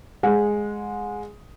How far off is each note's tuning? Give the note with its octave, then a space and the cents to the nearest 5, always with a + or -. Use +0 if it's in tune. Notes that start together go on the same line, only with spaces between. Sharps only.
G#3 +0 F#5 -35